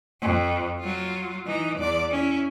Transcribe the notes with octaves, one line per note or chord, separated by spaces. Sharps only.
F2
F#3 F4
E3 D#4
E2 D5
C#4 E4